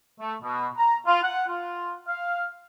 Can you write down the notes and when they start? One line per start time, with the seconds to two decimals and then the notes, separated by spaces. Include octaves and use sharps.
0.20 A3
0.43 B2
0.77 A#5
1.06 F4
1.23 F#5
1.49 F4
2.08 F5